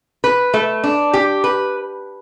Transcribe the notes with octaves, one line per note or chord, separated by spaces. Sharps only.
B4
A3
D4
G4
B4